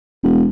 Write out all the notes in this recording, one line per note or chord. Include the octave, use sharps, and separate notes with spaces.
E1